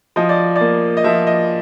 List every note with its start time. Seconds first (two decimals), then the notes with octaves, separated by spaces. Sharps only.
0.16 F3 D#5
0.29 D5
0.56 A#3 D5
0.97 D#5
1.04 F3 E5
1.27 D#5